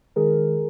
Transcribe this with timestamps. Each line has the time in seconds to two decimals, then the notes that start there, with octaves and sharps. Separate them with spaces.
0.16 D#3 G#3 G#4 A#4